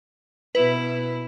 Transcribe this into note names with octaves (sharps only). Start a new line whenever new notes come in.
B2 E4 B4